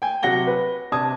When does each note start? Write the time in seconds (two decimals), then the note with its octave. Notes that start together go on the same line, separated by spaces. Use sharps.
0.02 G5 G#5
0.23 C3 F#3 F#5 A#6 G7
0.47 B4
0.92 C3 D4 A5 D#6 G#6